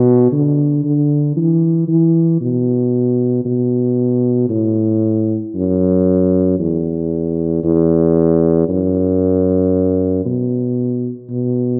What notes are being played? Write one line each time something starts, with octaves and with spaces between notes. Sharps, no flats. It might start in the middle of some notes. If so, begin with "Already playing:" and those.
Already playing: B2
D3
D3
E3
E3
B2
B2
A2
F#2
E2
E2
F#2
B2
B2